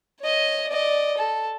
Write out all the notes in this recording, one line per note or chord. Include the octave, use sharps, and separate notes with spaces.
C#5 D#5
D5 D#5
A4